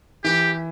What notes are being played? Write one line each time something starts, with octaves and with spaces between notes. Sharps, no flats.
E3 G4